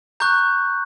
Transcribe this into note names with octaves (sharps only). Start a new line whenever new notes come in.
A#5 C#6 F#6 G6